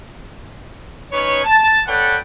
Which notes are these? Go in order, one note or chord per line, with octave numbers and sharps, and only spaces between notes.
C#4 D#4 B4 C#5
A5
A4 B4 C#5 D5 F#5 G5